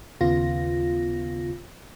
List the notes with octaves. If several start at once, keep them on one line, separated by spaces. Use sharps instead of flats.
D#2 C#3 B3 F4 A#6